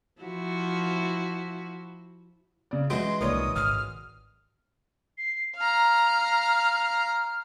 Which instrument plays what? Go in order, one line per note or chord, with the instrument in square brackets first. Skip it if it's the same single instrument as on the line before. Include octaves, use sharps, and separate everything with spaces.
[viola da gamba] F3 E4 F#4
[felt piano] C#3 D5
[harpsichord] E3 F#3 G#3 [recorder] C6 [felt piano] D7
[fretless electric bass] C2 A#2 D#3 [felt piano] A#4 C#5 D5 [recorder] D#6
[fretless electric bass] G#1 [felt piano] D#6 [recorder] F6
[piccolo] C7
[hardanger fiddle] F5 A#5 [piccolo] F6